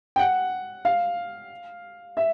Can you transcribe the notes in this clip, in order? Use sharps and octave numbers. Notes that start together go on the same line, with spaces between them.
G5
F#5
F5
E5